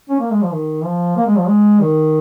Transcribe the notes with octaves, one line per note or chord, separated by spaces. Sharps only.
C#4
A#3
G#3
F3
D#3
F3
A#3
G#3
F3
G#3
D#3